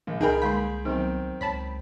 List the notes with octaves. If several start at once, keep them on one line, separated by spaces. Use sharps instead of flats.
A#1 D#3
C2 D#4 G#4 A#4 G5 B5
D3 G#3 A#3 C6 B6
D#3 F#3 B3 C4
C#2 C#5 A5 B5 B6